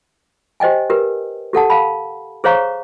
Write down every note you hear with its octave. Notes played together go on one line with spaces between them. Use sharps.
G4 C5 D#5 G5 G#5
G4 A#4 B4
G4 A4 F#5 A5
F5 A5 B5
G#4 C5 C#5 F5 A#5 C#6